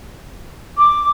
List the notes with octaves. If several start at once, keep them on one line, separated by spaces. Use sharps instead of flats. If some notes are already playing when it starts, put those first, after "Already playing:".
D6